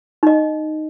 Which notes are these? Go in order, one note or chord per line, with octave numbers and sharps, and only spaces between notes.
D#4 D#5